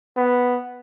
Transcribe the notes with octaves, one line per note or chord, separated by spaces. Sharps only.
B3